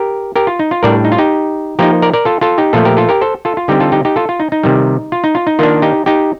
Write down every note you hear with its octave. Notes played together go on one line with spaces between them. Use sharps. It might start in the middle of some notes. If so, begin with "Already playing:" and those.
Already playing: G4 A#4
G4 A#4
F4
D#4
F4
A2 G3 D4 A#4 D5
D#4
F4
D#4 G4
F3 A#3 D#4 G4 A#4
A#4 D5
A#4 D5
F4 A4
F4 A4
D#4 G4
A#2 F3 A3 F4 A4
G4 A#4
F4 A4
G4 A#4
A4 C5
F4 A4
F4
D3 G3 C4 D#4 G4
F4 A4
D#4 G4
D#4 G4
F4 A4
F4
D#4
D#4
C3 D#3 G3
F4
D#4
F4
D#4
D#3 A#3 D4 F4
D#4 G4
D#4 G4